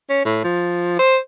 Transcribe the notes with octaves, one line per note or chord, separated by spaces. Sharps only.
C#4
A2
F3
C5